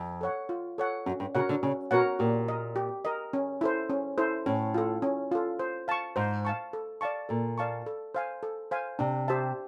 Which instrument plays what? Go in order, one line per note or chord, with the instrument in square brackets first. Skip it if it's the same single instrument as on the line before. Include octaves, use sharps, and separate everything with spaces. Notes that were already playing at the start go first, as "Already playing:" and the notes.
Already playing: [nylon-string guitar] F2
[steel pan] A4 C#5 F#5
F4
A4 C#5 F#5
[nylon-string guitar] F#2 [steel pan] C#4
[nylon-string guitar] G2
[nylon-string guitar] C#3 [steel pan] F#4 A#4 C#5 F#5
[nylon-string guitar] D3
[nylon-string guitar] C#3 [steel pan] C#4
[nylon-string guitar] B2 [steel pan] F#4 A#4 C#5 F#5
[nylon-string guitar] A#2 [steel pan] G4
[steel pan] A#4 D#5
G4
A#4 D#5
C#4
E4 A4 C5
C#4
E4 A4 C5
[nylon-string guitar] A2 [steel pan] C#4
[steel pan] F4 A4
C#4
F4 A4
C5
F5 A5 C#6
[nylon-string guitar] G#2 [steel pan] C5
[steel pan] F5 A5 C#6
A4
D5 F5 A5 C#6
[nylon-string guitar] A#2 [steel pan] A4
[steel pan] D5 F5 A5 C#6
A4
C5 F5 G#5
A4
C5 F5 G#5
[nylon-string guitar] C3 [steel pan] D4
[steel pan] G4 C5 E5 A5